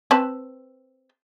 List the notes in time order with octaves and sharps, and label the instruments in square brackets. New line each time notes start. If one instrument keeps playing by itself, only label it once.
[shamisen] C4 B4 A5